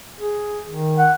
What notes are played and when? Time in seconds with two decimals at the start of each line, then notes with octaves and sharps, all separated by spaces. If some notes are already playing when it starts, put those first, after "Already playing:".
0.20 G#4
0.69 D#3
0.98 F#5